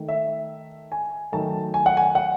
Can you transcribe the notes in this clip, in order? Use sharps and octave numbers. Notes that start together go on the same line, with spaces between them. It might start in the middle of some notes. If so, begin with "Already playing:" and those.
Already playing: D#3 A3
E5
G#5
D#3 F#3 A3 A5
G#5
F#5
G#5
F#5